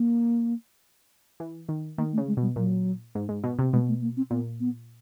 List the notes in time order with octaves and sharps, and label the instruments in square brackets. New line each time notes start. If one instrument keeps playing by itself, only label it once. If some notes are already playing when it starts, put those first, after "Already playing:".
Already playing: [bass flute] A#3
[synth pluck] E3
D#3
[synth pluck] D#3 [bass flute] A#3
[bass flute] A3
[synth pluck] C#3
[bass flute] G#3
[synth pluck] B2 [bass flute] G3
[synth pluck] A#2 [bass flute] F#3
[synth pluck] G#2
G#2
B2
C3
[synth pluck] B2 [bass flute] G#3
[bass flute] A3
A#3
C4
[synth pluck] A#2 [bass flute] B3
[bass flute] B3